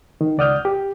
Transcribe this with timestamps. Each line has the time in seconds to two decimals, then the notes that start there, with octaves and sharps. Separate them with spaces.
0.21 D#3
0.38 C#2 D5 F#5 D#6 F6 G6
0.65 G4